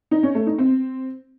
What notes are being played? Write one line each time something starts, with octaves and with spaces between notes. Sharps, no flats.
D#4
C#4
A3
D#4
C4